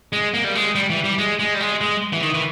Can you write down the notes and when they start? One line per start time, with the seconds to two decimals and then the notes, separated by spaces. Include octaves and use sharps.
0.13 G#3
0.34 A#3
0.44 G3
0.55 G#3
0.75 G3
0.90 E3
1.04 G3
1.18 G#3
1.39 G#3
1.54 G3
1.60 G#3
1.81 G#3
2.13 E3
2.23 D#3
2.34 E3